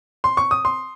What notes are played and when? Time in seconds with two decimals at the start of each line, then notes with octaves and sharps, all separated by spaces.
0.24 C6
0.37 C#6
0.51 D#6
0.65 C6